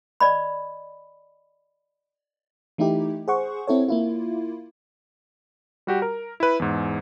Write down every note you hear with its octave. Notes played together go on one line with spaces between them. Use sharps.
D5 D#5 B5
E3 A3 D#4 E4 G4
G#4 C5 F#5 C#6
C4 E4 A4 C#5
A#3 E4 F4
G3 F#4 G4
A#4
E4 B4
E2 G#2